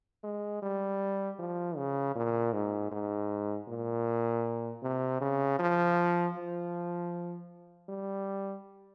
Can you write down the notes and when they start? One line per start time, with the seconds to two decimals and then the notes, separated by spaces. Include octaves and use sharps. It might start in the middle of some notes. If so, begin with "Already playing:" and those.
0.24 G#3
0.62 G3
1.39 F3
1.77 C#3
2.15 A#2
2.53 G#2
2.92 G#2
3.68 A#2
4.83 C3
5.21 C#3
5.59 F3
6.36 F3
7.89 G3